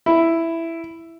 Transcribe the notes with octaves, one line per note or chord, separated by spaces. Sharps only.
E4